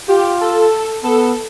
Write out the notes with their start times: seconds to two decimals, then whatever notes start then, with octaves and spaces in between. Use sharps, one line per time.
0.08 F4 G4
0.41 A4
1.04 B3 A4